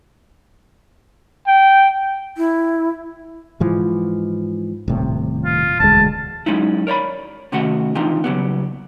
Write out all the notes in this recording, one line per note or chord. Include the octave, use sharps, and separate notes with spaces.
G5
E4
G#2 E3 F3
D#1 A2 C3
F4
E1 D2 G#3 A5
F#3 G#3 C#4 D#4 E4
A#4 C#5 D5 B5
C3 D#3 A3 C#4 F#4 F#5
E3 F3 C4 D4 D#4 F4
C#3 F#3 G3 B3